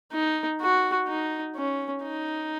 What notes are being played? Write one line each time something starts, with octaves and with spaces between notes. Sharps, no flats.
D#4
F#4
D#4
C#4
D#4